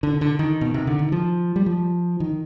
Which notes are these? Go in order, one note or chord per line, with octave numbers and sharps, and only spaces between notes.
D3
D3
D#3
B2
C3
D3
D#3
F3
G3
F3
D#3